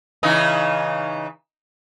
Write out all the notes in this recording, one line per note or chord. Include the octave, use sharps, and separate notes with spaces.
C#3 E3 D#4